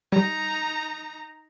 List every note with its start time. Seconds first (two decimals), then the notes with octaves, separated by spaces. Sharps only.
0.12 G3 D#4 A#5